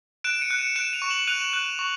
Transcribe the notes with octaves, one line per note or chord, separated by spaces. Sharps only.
F#6 D7 E7
D7
C#7 D#7
F#6
C#7 D#7
F#6 D7 E7
D#7 F7
C#6
E7 F#7
F#6 D#7 F7
F#6
C#6